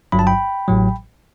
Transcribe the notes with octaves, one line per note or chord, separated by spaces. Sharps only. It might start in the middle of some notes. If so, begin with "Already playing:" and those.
G1 G2 F#3 B5
A5
G5 B5
A1 A2 F#3